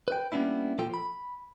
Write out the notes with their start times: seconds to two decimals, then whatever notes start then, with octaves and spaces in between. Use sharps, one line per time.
0.08 B4 G5
0.32 G3 A#3 B3 C#4 D4 E4
0.78 A#2 F3 F4 A4 G5
0.94 B5